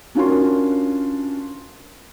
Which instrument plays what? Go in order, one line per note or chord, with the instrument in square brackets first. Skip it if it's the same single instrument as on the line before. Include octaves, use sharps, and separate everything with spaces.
[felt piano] C#4 D4 F4 F#4 A#4 C6